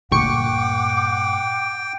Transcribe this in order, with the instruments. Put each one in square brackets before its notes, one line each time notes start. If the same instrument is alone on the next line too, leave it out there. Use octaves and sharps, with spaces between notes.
[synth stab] D2 C#6 C#7 [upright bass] G2 A#2 [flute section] F#5 D6 [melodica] G5